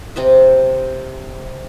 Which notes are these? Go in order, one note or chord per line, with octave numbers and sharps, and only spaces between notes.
C3 C4 D#5 E5